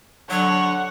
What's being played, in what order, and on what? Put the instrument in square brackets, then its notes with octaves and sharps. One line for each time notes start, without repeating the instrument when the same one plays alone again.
[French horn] D3 [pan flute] F#3 [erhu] C#5 [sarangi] F#5